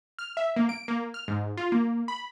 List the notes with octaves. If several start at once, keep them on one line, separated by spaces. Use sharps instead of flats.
F6
E5
A#3
D7
A#3
F6
G#2
F4
A#3
B5